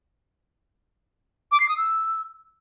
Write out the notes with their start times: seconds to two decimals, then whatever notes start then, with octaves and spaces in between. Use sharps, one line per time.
1.52 D6
1.60 C7
1.69 D#6
1.77 E6